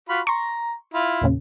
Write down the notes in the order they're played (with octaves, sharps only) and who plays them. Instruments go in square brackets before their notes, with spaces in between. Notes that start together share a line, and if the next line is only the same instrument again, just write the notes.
[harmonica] F4 F#4 B5
[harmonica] A#5 [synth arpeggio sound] C6 C#6
[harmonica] E4 F4
[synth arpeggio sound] E2 A#2 C#3